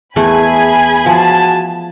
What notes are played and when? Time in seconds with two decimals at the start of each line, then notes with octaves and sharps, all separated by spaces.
0.16 E2 A3 E4 G#4 G#5 B5
1.06 F3 F#4 A5